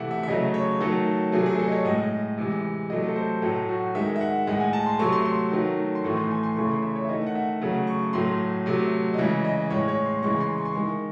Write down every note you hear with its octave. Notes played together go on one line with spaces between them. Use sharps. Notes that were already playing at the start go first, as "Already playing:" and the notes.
Already playing: C3 E3 A3 E5 F#5
E5
E5
C#3 F#3 A3 D#5
C#5
D#3 F#3 A3 A4
C3 F#3 A3 G#4
G#4
A4
D#5
C#5
A2 G#3 D#5
C3 E3 G#3
C3 F#3 A3 D#5
A4
C5
A2 F#3 A3 A4
F#4
D#3 G#3 E5
E5
F#5
A2 G#3 F#5
G#5
A5
C6
C3 F#3 A3 C#6
C6
C6
D#3 F#3 A3
C6
A2 E3 A3 C#6
C6
G#5
C6
C#3 E3 A3 C#6
C6
E5
C#5
E5
D#3 A3 D#5
F#5
E5
C#3 F#3 A3 F#5
C#6
A2 F#3 A3 C6
C3 F#3 A3
D#5
C#3 E3 G#3 E5
D#5
A2 G#3 C#5
C#5
C6
C#3 E3 G#3 C#6
C6
C#6
C6
D#3 G#3 C#6